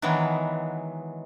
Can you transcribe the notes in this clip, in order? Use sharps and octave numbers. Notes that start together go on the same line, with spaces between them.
D#3 E3 F#3 G#3 B3